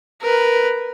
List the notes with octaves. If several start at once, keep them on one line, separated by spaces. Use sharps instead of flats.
A#4 B4